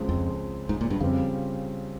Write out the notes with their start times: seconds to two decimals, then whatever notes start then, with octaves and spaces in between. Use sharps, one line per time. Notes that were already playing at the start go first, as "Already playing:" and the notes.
Already playing: C#2 C#3 F3 G#3 C4
0.09 F2
0.69 G#2
0.81 A#2
0.90 G2
1.00 F2 C#3 G3 C4 F4